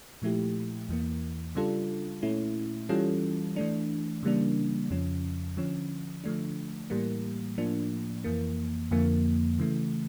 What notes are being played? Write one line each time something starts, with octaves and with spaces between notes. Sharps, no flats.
A#2 F3 A3 E4 G4
E2 E3 A#3
C#3 G3 D4 F4 A4
A#2 A3 C#4 E4
E3 G3 C#4 F4 A4
E3 A3 D4
C#3 E3 G3 A#3 D4
F2 C#3 F3 C#4
D3 F3 C#4
D3 F3 A3 D4
A2 E3 G3 A#3
A2 F3 A#3 D4
F2 E3 A#3
F2 D3 F3 A#3
C#3 E3 A3